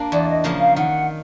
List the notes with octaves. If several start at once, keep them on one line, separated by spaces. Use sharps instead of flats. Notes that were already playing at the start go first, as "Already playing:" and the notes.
Already playing: A#3 D4
E2 D5
D#5
C#3 F3 A#3
F5
D#3 F#5